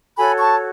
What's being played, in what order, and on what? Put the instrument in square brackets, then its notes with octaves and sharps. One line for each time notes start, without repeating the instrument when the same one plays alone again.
[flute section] F#4 A4 C#5 G#5 B5
A5 C#6